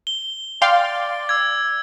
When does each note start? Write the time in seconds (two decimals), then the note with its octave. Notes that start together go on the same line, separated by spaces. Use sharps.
0.07 G7
0.62 D5 F5 G5 C6
1.29 E6 G#6